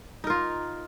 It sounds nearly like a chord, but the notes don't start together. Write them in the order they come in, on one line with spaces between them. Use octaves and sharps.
D#4 A#4 F4